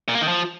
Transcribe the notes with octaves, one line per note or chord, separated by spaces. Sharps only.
A#2
A#3
D#3
F3